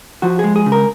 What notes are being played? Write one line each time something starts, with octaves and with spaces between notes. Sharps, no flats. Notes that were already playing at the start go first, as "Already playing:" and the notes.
F3 F#4
G#3 G#4
G#4
C#3
A#4